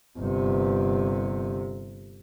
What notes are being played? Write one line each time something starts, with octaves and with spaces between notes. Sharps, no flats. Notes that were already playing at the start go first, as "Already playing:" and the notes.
G1 C3